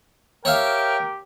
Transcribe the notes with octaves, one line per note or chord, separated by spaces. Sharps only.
G4 A#4 C#5 E5 F5 G5